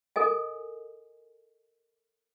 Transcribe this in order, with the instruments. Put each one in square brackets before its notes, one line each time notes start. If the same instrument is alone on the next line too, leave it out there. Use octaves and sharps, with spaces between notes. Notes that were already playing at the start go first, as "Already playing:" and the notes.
[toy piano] A4 A#4 D#5 G#5